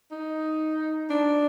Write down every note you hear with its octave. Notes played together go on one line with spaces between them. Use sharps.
D#4
D4